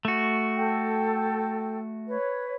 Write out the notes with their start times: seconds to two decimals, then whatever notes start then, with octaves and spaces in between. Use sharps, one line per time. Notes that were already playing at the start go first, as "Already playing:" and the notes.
0.05 A3 F#4
0.57 A4 G5
2.07 B4 C#5